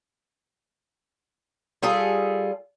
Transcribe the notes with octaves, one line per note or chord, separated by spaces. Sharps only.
G3 F4 G#4 A4